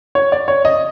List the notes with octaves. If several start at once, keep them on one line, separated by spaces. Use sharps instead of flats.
C#5
D5
C#5
D#5